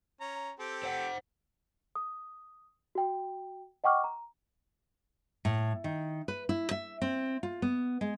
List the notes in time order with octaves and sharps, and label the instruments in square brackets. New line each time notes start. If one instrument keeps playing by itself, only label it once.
[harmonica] C#4 A#5
C4 G4 A4
[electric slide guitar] C5 F#5
[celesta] D#6
F#4 G5
D#5 F#5 G5 C#6 D6 F6
A#5
[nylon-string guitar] A2
D#3
B4
E4
E5
C4
F4
B3
G#3